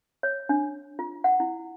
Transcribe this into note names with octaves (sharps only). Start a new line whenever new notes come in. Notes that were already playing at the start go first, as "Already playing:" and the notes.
C#5
D4
F4
F#5
E4